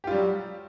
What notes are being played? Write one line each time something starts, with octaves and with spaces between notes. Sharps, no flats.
F#3 G3 F4 G4